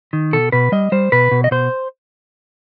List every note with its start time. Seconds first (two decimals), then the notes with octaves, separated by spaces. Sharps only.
0.13 D#3
0.33 B2 A4
0.52 B2 B4
0.72 G3 D#5
0.92 G3 C5
1.12 B2 B4
1.31 B2
1.44 D#5
1.51 B2 C5